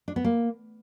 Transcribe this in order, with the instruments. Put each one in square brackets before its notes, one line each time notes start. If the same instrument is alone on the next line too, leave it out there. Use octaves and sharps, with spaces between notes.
[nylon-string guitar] D4
B3
A#3